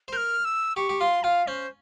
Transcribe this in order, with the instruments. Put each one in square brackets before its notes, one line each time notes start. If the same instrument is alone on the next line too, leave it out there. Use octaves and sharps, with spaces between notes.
[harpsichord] C5
[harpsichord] A#4 [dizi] G6
[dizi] F6
E6
[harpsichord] G4 [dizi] C#6
[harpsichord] G4
[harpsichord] F4 [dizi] C6
[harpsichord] F4 [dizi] F5
[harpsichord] C#4 [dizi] C5